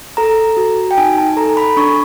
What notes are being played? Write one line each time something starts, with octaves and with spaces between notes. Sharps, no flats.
A4 A#5
F#4
G5
D#4 G#5
A5
A4 A#5
B5
D4 C#6